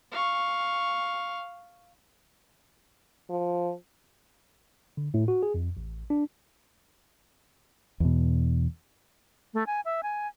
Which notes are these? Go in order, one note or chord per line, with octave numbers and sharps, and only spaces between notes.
F5 C#6
F3
D3
A2
F#4
G#4
F2
A1
D4
E2 B2
A3
G#5
E5
G#5